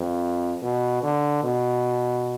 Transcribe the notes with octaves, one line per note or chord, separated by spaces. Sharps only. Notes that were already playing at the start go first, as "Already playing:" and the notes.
Already playing: F2
B2
D3
B2